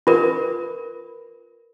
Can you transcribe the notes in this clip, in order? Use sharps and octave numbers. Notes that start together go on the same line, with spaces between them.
F4 A#4 B4